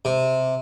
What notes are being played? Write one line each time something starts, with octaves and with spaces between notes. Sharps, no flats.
C3